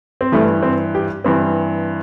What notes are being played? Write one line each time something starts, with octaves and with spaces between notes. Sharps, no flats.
C4
G2 E3 A3
C4
G4
G2 E3 C4